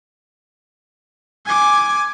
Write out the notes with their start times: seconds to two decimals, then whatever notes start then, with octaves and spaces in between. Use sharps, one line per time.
1.46 G#5 D6